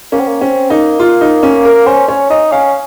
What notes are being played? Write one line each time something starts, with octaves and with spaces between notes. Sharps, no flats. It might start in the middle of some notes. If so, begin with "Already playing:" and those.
A#3 C#4
C4
A#3
C4 C#4
A#3 D#4
F4
D#4
C#4
A#4
C#4 C5
C#4 C#5
D#4 D#5
C#4 F5